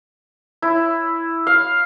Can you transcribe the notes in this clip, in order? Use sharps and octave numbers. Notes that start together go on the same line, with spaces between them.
E4
F5